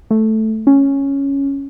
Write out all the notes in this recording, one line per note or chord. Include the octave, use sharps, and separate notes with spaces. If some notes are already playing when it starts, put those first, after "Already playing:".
A3
C#4